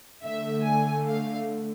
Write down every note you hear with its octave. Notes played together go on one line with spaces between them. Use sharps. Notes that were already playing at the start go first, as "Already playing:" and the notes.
D3 A3 E5
G#5
F5